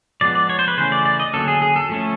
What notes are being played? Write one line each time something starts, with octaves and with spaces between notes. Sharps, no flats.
F3 G#3 B3 D5
D5
C#5
C5
B4
C#3 E3 A3 C#4 C5
D5
D5
D#5
D3 F#3 A#3 C#4 A4
G#4
G#4
A4
F3 A3 C#4